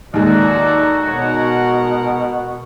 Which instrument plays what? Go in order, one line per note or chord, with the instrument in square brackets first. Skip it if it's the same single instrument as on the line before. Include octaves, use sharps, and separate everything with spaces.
[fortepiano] D#2 G#3 [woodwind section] D#4 F#4 [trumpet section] F4 A4 D5
[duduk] B2 [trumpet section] G#3 A#4 F#5 [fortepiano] C#5